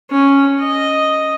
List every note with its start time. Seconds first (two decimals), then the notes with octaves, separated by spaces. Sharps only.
0.11 C#4
0.60 D#5